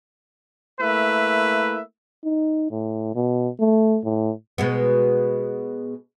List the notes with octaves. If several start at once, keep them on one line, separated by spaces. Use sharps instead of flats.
A3 A#3 E4 B4 E5
D#4
A2
B2
A3
A2
B2 G#3 B3